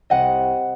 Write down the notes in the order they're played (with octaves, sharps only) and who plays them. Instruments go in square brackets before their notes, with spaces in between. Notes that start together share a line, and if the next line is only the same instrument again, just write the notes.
[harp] C2 D#5 F#5